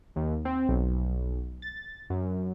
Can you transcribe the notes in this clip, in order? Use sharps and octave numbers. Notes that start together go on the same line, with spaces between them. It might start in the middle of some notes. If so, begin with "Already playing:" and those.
D#2
C4
B1
A6
F#2